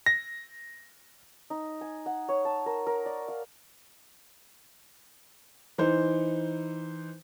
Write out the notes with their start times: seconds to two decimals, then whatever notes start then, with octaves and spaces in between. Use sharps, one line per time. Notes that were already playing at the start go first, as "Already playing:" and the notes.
0.06 A#6
1.50 D#4
1.81 G#5
2.06 F#5
2.29 C#5
2.45 A5
2.66 A#4
2.87 A#4
3.06 D5
3.28 F5
5.78 E3 D#4 C5